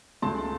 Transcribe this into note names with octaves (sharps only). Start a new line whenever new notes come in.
C#2 C#3 A3 A5 C6